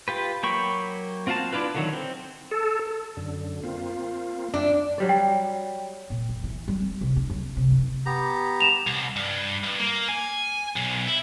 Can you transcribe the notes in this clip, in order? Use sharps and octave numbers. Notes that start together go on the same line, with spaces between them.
F4 G4 B4
F#3 A#3 G5 B5 C#6
C4 F4 F#4 F5 A5
D4 E4 F4 B4
D3 D#3 F#3
C4
A4
F#2 D3
A#3 C4 F4
F#2 D4 E5 G5
F#3 G3 D5
G5
A#2
F2
E3
G3
C4
C2
D4
F#2
C3
F#1
B3 G4 A#5
E7 F7
C2
G2
G2
A#3
G#5
B1
E4